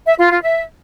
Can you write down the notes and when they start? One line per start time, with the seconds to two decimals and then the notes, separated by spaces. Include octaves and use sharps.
0.07 E5
0.18 F4
0.30 F4
0.42 E5